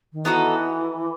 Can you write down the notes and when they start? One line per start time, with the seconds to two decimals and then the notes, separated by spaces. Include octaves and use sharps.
0.13 D#3
0.25 E3 B3 D#4 F#4 A4